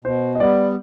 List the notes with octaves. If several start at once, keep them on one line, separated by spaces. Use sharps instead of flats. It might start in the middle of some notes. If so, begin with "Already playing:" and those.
B2 C5
D#5
G3 B3 D5